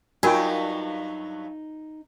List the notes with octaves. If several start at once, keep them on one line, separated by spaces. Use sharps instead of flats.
G2 F#3 D#4 F4 F#4 A#4 G5 G#5